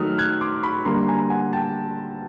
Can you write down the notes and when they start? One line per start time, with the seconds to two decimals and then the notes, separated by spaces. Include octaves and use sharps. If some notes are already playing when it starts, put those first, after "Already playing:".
Already playing: D#3 F#3 A3 D#6 F6
0.18 F#6 G#6
0.41 C6 D6
0.63 B5 C#6
0.85 D3 G3 A#3 A#5 C6
1.08 G#5 A#5
1.30 F#5 G#5
1.53 G5 A5